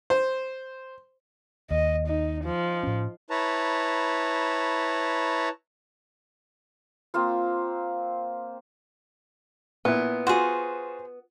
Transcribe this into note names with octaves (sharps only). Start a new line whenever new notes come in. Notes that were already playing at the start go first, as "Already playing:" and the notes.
C5
D#2 D#5
D#4
F3
A2 C#4
E4 B4 C#5 A5 A#5
A#3 C4 F4 C5
A#2 B3 E4
F4 F#4 G#4 C5